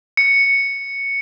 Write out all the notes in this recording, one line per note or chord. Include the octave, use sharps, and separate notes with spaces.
C#7